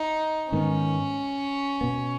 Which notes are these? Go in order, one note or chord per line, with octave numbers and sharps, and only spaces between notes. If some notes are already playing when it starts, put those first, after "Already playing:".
Already playing: D#4
G#2 D#3 B3 C#4
B2 B3